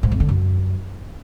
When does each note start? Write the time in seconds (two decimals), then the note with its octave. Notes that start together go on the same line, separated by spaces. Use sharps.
0.03 G#2
0.12 F2
0.20 D3
0.29 F#2